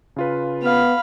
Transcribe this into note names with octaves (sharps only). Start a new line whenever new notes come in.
C#3 F4 B4
B3 F5 B5